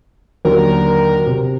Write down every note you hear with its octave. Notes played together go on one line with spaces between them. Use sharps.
D#2 D3 F#3 A#4
C3